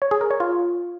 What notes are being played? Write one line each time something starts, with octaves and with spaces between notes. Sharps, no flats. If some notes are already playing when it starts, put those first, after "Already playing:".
C#5
G#4
A#4
C#5
F4